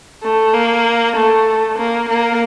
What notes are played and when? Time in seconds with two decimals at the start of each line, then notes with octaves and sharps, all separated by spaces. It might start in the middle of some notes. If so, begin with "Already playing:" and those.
0.23 A3
0.54 A#3
1.16 A3
1.78 A#3
2.09 A#3